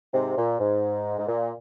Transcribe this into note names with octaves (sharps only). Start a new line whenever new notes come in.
G#2 C3
A#2
G#2
G#2
A#2